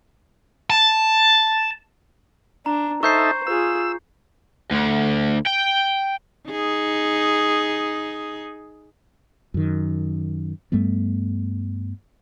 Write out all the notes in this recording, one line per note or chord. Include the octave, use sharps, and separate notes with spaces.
A5
D4 A#5
D#4 A4 C5 E5 C#6 G6 C7
F4 G#4 E6
D2 D3
G5
D#4 G#4
F#2 D#3
G2 G3 A3 B3